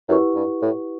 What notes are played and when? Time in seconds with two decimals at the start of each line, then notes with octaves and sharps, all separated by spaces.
0.09 F#2 E4 G4 B4 F#5 C#6
0.35 G2
0.62 A2